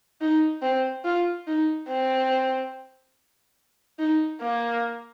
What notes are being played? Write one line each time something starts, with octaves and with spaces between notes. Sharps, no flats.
D#4
C4
F4
D#4
C4
D#4
A#3